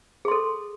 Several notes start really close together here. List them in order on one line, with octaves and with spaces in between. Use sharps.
G#4 C6 A4